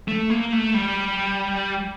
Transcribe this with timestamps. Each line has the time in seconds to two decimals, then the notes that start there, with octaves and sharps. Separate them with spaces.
0.08 A3
0.30 A#3
0.52 A3
0.74 G3